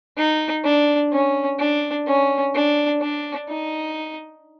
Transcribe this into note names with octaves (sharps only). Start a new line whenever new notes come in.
D#4
D4
C#4
D4
C#4
D4
D4
D#4